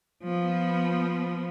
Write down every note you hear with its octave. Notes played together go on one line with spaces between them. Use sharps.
F3 B3